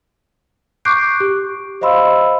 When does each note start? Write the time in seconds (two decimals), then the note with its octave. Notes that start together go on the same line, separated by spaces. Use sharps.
0.85 C#6 D6 F#6 G6 C7 D7
1.20 G4
1.81 C5 D#5 F5 B5 C6 E6